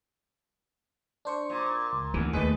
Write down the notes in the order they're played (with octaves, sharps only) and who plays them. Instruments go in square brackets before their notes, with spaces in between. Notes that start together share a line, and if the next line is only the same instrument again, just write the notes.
[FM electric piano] D4 C5 C#6
[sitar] A#2
[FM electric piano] C#2
[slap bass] D2 E3
[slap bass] D#2 A3 [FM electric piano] G#4 D#5 [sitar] B4